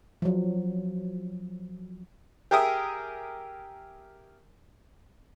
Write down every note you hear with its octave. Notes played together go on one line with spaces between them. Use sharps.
F3 F#3
G4 G#4 A#4 E5 D#6